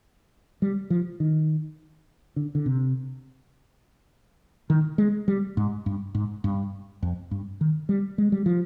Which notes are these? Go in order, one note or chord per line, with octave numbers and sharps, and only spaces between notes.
G3
F3
D#3
D3
D3
C3
D#3
G#3
G3
G#2
G2
G#2
G2
F2
G2
D#3
G3
G#3
G3
F3